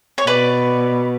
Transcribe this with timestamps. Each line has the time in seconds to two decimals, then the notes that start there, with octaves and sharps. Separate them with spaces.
0.18 C#5
0.27 B2 B4 D5